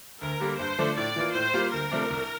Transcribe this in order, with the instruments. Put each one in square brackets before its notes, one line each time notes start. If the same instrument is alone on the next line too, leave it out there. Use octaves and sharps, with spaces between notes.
[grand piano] D2 [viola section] A#4
[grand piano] D3 G3 A#3
[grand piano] G2 [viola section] C5
[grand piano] D3 F3 A3 D4
[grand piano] A2 [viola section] D5
[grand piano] E3 A#3 F4
[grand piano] A2 [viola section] C5
[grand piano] G3 A#3 F4
[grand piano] D2 [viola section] A#4
[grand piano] C3 F3 A3 D4
C2